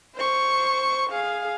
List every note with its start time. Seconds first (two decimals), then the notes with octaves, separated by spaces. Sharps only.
0.15 C5 C#6
1.10 G#4 F5